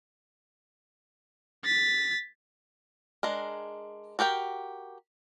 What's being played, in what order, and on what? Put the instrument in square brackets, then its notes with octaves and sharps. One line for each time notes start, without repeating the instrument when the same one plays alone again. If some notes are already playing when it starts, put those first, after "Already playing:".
[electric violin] A6 B6
[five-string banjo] G#3 D4 A#4
F#4 G4 A#4 G5